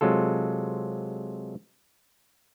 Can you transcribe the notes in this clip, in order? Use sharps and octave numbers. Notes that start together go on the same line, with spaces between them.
C3 F#3 G#3 F4 A4